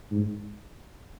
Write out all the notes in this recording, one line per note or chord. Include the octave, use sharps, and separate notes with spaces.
G#2